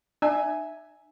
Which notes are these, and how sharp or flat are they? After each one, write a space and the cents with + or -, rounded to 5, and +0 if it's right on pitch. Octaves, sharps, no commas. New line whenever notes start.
D#4 -45 E5 +0 G#5 +5